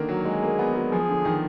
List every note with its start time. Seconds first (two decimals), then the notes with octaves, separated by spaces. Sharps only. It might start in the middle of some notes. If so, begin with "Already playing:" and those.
Already playing: D3 D#3 A#3
0.09 F#3
0.25 G#3 G#4
0.43 A#3
0.59 B3
0.76 G#3
0.92 F3 G#4
1.09 D3
1.25 D#3